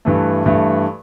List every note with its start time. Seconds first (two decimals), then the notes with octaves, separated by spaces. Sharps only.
0.05 G2 E3 A3
0.46 G2 E3 A3